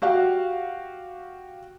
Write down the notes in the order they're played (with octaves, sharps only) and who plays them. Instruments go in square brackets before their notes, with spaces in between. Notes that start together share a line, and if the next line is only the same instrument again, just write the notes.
[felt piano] F#4 G4 F5 F#5